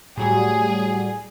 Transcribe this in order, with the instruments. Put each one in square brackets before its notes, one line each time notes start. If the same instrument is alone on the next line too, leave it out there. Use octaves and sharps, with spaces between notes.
[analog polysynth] A2 F#3 G3 [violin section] G#4